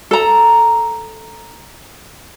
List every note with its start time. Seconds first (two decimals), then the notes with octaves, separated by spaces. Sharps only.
0.11 A4 A#5